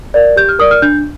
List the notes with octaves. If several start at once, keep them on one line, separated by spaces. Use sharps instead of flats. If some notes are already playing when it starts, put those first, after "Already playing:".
A#4 D5
G4 G6
F6
A#4 D5 D#6
F6
D4 G6